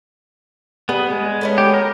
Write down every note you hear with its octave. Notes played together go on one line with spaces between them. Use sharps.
G3 B3 G#4 G#5
G#3
A3 B3 C#4
G4
A#4